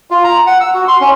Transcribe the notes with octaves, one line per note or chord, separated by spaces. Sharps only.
F4
A#5
F#5
E6
F#4
C6
C#4